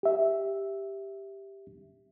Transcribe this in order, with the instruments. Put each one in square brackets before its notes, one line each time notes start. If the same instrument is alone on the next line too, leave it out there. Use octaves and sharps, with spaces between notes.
[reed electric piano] G4 E5